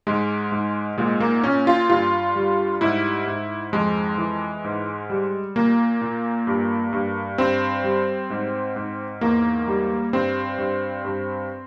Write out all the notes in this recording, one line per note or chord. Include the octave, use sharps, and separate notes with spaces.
G#2 G#3
G#2
A#2 G#3
A#3
A#2 C#4
F4
G2 F4
G3
G#2 E4
G#2
F2 G#3
E3
G#2
G3
A#2 A#3
A#2
G2
G2
G2 C4
G3
G#2
G#2
E2 A#3
G3
G2 C4
G2
G2